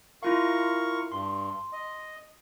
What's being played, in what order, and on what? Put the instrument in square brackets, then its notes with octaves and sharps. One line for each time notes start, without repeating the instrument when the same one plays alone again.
[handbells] E4 F4 F5 [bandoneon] A#4 C#6
[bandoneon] G2 [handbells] C6
[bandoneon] D#5